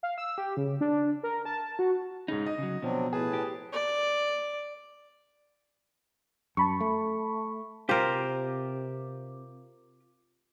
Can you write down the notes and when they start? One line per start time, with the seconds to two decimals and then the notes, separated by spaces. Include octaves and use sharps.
0.03 F5
0.18 E6
0.38 G4
0.57 C#3
0.81 D4
1.23 A#4
1.45 A5
1.79 F#4
2.28 G#2 C#3 D#4
2.46 D#5
2.58 C#3 F#3
2.82 B2 F3 F#3 C4 D4
3.13 A2 G#4 B4 A5
3.33 G4
3.73 D5
6.57 F#2 A5 B5 C#6
6.80 A3
7.89 C3 F4 G4 A#4 C5